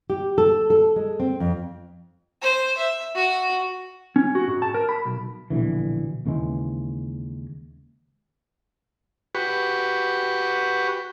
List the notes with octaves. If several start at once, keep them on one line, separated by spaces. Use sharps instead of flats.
G4
A4
A4
G#3
C4
F2
C5
E5
F#4
C#4
F#4
G#2
A5
A#4
B5
B1
A#1 B2 D3 E3
D#2 C#3 E3 G#3
F#4 G4 B4 C#6